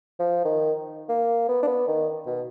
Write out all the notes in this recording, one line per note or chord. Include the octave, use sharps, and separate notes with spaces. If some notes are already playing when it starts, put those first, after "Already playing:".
F3
D#3
A#3
B3
D4
B3
D#3
B2